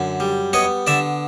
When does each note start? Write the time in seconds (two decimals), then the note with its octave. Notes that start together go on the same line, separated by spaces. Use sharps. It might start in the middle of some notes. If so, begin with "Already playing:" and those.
Already playing: F#2 D3
0.20 G3
0.53 B3 C#5 D#5
0.87 D3 D5 E5